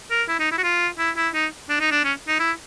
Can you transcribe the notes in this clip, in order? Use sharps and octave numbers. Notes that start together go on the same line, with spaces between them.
A#4
E4
D#4
E4
F#4
F4
E4
E4
D#4
D4
D#4
D4
C#4
D#4
E4